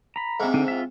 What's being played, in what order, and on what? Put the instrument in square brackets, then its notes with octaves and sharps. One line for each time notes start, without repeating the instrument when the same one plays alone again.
[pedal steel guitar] A#5 B5
[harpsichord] G#2 C3
[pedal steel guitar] D3 C4 D#4
F4 E5